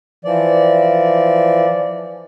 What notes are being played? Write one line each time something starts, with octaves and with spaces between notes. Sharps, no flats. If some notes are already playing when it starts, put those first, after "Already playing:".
E3 F3 D5